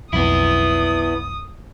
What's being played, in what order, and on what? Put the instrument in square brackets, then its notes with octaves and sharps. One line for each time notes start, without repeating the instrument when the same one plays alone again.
[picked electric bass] B1 F2 [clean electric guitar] B3 E4 [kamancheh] D#6